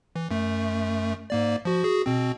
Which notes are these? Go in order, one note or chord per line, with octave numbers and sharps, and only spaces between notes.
E3
F#2 A3
G#2 A#3 D5
F3 F#4
F#4 G#4
B2 C4